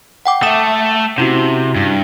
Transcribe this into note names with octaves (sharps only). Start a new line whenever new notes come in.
F#5 G5 D6
A3 A4 E5 D#6
C3 C#4 E4 F#4
G2